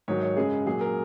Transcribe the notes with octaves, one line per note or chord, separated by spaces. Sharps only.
G#2 D#3 F#3 C#5
C#5
F#2 C#3 G#3 G#4
A#2 F#3 G#4
A#4